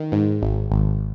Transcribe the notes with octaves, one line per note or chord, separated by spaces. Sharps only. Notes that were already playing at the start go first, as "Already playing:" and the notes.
Already playing: D#3
G#2
G#1
G#1